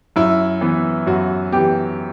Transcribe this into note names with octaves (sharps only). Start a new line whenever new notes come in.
F#2 E4
E3 B3
F#2 F#4
E3 B3 G4